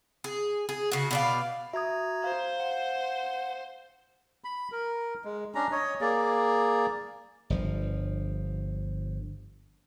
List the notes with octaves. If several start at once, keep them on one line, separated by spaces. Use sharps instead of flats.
G#4
G#4
C#3 F#4
B2 D5 F5
F#4 E5 A#5 D#6 G#6
C5 F5
F#5
B5
A#4
G#3
C#4 D4 A#5
C#5 D#5
A#3 G#4 D5
G1 F3